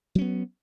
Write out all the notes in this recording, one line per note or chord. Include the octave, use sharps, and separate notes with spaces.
F#3 B3 C#4